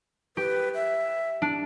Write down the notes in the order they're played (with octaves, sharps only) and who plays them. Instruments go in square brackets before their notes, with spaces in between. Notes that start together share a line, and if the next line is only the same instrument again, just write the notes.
[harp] G4 [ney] B4
[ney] E5
[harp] D4